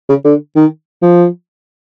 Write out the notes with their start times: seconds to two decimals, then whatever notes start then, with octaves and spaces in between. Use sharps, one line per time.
0.09 C#3
0.25 D3
0.56 D#3
1.02 F3